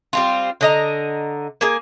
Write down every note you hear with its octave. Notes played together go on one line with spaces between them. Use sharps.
G3 C4 F4
D3 D#5 A#5
A#3 G#4